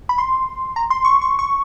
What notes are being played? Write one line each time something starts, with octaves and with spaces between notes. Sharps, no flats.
B5
C6
A#5
C6
C#6
C#6
C#6